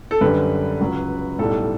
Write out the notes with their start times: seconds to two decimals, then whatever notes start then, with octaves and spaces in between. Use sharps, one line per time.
0.11 A4
0.21 F#2 D3 G3 B4
0.81 C#2 C#3 F#3
1.39 B1 A2 G3 A4